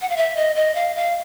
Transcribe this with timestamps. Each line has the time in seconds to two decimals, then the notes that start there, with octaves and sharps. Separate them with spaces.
0.01 F#5
0.10 F5
0.17 E5
0.37 D#5
0.56 D#5
0.75 F5
0.96 F5